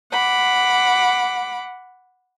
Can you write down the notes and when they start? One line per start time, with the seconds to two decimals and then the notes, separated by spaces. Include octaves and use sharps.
0.11 F#5 B5 D6